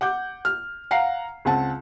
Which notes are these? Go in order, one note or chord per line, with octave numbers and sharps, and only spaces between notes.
F#5 D6 G6
F6
F5 F#5 A#5 C7
C#2 C4 F#5 A5